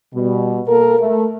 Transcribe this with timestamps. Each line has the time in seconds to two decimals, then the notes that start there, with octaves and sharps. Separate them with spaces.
0.15 B2 G3
0.68 A#3 A4 A#4
0.99 A3